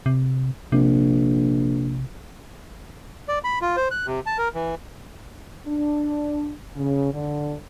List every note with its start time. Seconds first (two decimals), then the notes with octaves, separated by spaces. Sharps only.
0.06 C3
0.72 A#1 C3
3.28 D5
3.44 B5
3.61 F4
3.77 C5
3.91 F#6
4.07 C3
4.26 A5
4.38 A#4
4.54 E3
5.66 D4
6.76 C#3
7.12 D3